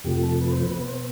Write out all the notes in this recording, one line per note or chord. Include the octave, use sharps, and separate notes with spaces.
F2 C3 F3 A3 G4
A4
B4
C5
B4
B2 B3 B4
C5